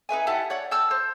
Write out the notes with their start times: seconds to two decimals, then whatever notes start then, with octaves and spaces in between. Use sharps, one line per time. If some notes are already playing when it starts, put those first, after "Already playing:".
0.09 D#4 B4 E5 G#5
0.27 E4 G4 F#5 A5
0.50 C#5 D5 F#5
0.71 G5 A5 E6 F6
0.91 C5